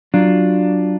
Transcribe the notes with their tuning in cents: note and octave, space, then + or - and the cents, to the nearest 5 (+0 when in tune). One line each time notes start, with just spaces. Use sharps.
F#3 +10 D4 +0 F4 +0